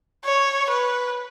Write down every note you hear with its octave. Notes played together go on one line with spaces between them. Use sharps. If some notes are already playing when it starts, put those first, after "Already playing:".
C#5
B4